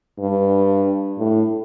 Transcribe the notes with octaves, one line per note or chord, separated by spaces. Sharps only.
G2
A2